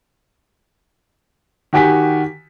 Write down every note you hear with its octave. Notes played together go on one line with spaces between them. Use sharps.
D#3 F#4 G4 G#5 B6